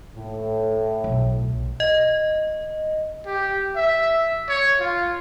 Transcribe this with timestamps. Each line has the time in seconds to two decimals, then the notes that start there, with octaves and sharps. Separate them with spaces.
0.15 A2
1.04 B1
1.80 D#5
3.26 G4
3.76 E5
4.49 C#5
4.80 F4